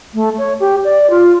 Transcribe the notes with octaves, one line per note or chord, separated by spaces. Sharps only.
A3
C#5
G4
D5
F4